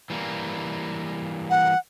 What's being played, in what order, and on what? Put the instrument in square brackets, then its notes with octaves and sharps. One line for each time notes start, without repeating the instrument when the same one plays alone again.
[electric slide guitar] E3 G3 A#3
[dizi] F#5